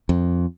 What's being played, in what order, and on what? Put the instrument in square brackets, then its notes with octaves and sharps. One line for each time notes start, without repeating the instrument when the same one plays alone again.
[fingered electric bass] F2